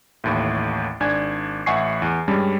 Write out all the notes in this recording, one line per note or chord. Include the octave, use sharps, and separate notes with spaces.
A1 D#2 A2
G#1 D4 G#5 G#6
A1 E5 F#5 G#5 C#6 C7
E2
G2 G3 G#3 C#4